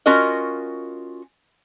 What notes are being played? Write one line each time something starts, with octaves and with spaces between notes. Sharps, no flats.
C#4 F4 F#4 A#4 D#5